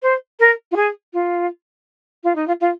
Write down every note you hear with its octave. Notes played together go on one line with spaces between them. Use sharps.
C5
A#4
F4
G#4
F4
F4
D#4
F4
F4